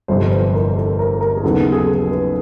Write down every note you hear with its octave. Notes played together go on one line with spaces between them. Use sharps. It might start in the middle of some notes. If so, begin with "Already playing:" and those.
G1 F2 C3 C5
B4
A#4
A4
A#4
A#4
G#4
D#2 C#3 F#3 B3 A4
G#4
G#4
A4
A4
B4